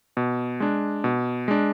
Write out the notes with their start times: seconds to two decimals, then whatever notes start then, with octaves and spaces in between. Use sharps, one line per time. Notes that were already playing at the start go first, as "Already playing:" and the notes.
0.17 B2
0.60 G#3 D4
1.04 B2
1.48 G#3 D4